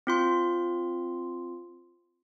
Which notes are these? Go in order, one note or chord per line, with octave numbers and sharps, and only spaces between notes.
C4 F4 C6